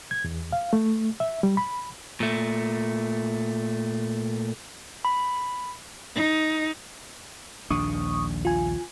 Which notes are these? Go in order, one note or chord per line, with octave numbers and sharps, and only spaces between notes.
G#6
E2
F5
A3
E5
G3
B5
A#2 A3
B5
D#4
A#1 D#2 D4 C#6 D#6
F4 G#5